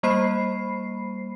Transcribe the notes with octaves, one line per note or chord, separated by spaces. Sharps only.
G3 A#3 C5 B5 C7